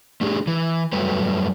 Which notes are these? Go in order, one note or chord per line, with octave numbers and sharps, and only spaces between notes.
A3 D4 G4 G#4
E3
F#2 F#3 G3 A3 B4